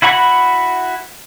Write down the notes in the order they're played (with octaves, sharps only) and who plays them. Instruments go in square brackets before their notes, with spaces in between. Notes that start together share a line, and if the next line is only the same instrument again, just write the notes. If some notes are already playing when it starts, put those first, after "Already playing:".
[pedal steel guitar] E4 F#4 F#5 B5 C#6